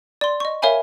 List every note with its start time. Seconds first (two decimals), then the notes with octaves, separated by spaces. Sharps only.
0.21 D5 C6
0.40 D#5 C#6
0.62 A#4 C#5 E5 F5 G#5 B5